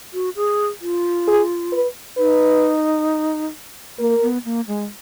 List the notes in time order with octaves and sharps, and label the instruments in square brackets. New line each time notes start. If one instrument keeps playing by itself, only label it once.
[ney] F#4
G#4
F4
[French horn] G#4
B4
[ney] D#4 [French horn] B4
[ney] A#3 [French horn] A#4
[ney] B3
A#3
G#3